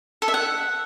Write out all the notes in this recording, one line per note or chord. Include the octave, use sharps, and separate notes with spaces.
A4
E5
F#5